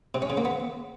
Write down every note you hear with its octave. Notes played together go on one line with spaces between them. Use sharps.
C3
C#4
C#3
A#3
B3